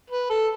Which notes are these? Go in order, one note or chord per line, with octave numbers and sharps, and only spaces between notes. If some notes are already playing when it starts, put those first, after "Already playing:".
B4
A4